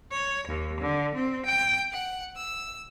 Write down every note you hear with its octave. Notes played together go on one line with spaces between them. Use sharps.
C#5
D#2
D3
C4
G5
F#5
E6